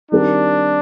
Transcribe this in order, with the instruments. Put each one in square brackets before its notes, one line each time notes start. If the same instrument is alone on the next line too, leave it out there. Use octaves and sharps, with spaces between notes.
[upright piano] D#3 G3 C4 G4 A#4 [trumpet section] D4